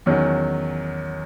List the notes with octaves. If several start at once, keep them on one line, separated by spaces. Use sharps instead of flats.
E2 D#3 F#3 C#4